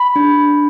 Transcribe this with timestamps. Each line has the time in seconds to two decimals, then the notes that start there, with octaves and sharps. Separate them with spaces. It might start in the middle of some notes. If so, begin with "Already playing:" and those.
Already playing: B5
0.16 D4